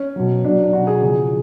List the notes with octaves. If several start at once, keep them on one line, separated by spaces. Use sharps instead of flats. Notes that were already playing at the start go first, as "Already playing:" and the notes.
Already playing: C#4
B2 F#3
B2 F#3 D4
D4
B2 F#3 F#4
G#4
C#3 F3 G#4